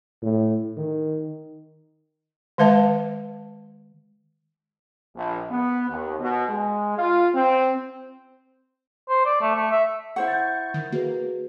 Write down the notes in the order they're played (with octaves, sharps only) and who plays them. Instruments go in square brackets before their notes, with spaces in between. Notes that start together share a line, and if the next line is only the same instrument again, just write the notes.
[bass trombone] A2
D#3
[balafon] D#3 G#3 B4 E5 A5
[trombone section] A#1
B3
D#2
B2
G#3
F4
C4
[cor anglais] C5
D5
A3
A3
E5
[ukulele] E4 C5 F#5 [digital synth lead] C#6
[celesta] G6 A6
[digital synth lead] D#3
[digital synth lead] A#3 [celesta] F#4 G#4 B4